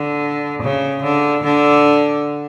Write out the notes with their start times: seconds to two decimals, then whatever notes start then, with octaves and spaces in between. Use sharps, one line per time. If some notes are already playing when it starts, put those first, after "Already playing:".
Already playing: D3
0.62 C#3
1.03 D3
1.45 D3